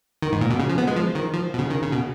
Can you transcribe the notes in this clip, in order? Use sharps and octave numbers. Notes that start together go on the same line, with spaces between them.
D#3
G#2
A#2
B2
C#3
F3
B3
G#3
F3
D#3
F3
B2
C#3
D#3
C#3
B2